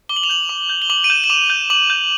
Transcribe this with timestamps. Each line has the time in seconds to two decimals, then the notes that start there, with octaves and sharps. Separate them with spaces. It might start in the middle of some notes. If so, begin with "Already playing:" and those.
0.09 D6 G7
0.16 F#7
0.23 F7
0.29 G6 F#7
0.49 D6
0.69 G6
0.82 G7
0.90 D6 F#7
1.04 D#7
1.10 G6 E7
1.24 E7
1.30 D6 F7
1.50 G6
1.70 D6 F#7
1.90 G6